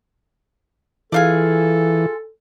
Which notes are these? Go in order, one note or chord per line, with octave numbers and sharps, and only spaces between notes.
E3 D4 F4 G#4 A4